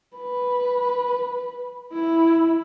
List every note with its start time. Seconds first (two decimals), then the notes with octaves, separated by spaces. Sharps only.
0.17 B4
1.93 E4